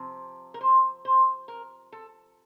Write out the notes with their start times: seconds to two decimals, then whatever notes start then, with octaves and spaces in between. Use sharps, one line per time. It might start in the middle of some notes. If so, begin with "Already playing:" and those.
Already playing: C3 F3 C4
0.54 A#4
0.61 C5
1.05 C5
1.48 A#4
1.92 A4